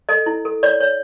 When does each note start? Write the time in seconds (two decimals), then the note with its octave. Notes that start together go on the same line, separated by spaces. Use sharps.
0.09 A4 D#5
0.26 E4
0.45 A4
0.63 C#5 D5
0.80 C#5